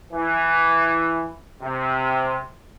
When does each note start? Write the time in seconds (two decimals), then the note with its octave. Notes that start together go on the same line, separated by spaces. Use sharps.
0.13 E3
1.62 C3